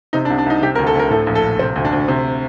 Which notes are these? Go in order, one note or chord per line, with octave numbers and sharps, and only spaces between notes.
C3 D#4
D4
C2
D4
C2 D#4
C3 G4
D2 A#4
A4
D2 A#4
A2 A4
A#1
A4
A#1
C3 C4
D2
D4
D2
C3